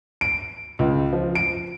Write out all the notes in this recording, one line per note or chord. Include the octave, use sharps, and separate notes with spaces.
D7
C#2
F3
D7